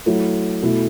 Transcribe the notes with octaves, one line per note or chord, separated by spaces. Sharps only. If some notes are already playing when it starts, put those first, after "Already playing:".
F#3 A3 E4
B2 A3 E4 A4